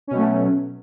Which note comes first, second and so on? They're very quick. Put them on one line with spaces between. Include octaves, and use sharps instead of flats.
C#4 B2 F#3 A3